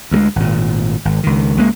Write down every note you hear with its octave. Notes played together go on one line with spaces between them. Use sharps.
D2 F#3 G#3
G#1 A#2
G#1
C#2 D#3
C#2 G#3 A#3